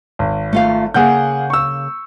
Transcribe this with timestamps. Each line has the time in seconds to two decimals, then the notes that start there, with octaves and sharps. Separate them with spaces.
0.19 G#1
0.53 A3 F4 F5
0.94 C#3 A#3 G#4 F#5 G6
1.50 C#6 E6